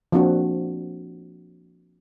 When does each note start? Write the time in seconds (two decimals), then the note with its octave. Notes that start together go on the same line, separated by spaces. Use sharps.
0.12 F3 A#3 C4 D4 F#4